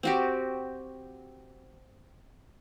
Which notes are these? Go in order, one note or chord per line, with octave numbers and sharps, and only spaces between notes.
C4 F#4 G4